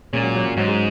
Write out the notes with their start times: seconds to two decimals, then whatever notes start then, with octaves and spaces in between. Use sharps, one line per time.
0.13 A#2 G#3 C#4
0.23 F#3
0.35 F#3
0.46 F#3
0.57 G#2 F#3
0.67 G#3